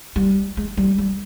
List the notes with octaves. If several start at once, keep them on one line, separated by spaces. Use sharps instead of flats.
G3
G#3
G3
G3